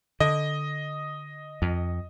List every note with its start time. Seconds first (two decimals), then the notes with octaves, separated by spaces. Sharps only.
0.20 D3 D#5
1.62 F2